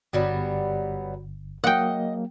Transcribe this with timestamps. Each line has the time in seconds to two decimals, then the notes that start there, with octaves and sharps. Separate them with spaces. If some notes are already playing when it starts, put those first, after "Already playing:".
0.13 G1 F#3 G3 B3
1.64 F#3 A#3 D#5 F#5 G5